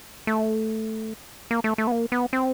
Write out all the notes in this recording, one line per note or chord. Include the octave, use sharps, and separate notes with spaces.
A3
A#3
A3
A3
B3
A#3
B3
C4